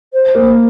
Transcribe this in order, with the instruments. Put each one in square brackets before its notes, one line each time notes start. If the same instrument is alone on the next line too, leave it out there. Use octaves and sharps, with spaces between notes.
[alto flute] C5
[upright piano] A#3